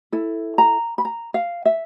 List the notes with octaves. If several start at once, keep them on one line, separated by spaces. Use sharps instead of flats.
E4 A4
A#5
B5
A#5
F5
E5